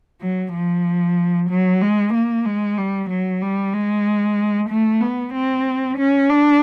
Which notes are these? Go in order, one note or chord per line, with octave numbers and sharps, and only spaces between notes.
F#3
F3
F#3
G#3
A#3
G#3
G3
F#3
G3
G#3
A3
B3
C4
C#4
D4